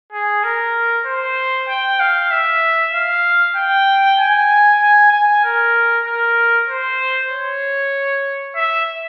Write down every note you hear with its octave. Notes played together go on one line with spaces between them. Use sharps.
G#4
A#4
C5
G5
F5
E5
F5
G5
G#5
G#5
G#5
A#4
A#4
C5
C#5
E5